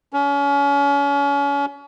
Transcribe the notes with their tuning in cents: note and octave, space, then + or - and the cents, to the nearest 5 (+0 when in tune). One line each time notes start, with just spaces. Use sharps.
C#4 +35